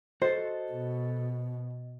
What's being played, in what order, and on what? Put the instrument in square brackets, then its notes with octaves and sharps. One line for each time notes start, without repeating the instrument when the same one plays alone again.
[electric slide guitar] F#4 A4 [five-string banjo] C5 [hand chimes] D#5
[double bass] B2